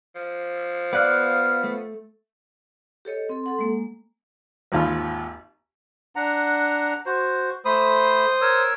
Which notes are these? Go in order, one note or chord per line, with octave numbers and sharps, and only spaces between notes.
F3
B3 D5 F5 F#6
A3
G4 A4 C#5 D#5
C4 A4
A4 F#5 C6
G#3 A#3
G#1 D#2 F4 B5
D4 F#5 A#5
F#4 C5
A3 C5 B5 D#6
A#4 C#5 E6